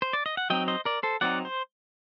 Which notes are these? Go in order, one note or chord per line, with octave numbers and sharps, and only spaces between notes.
C5
D5
D#5
F#5
F#3 C4 D#4 D#5 G5
C5 D#5
A#4 D5
A4 C5
F#3 C4 D#4 D5 F#5
C5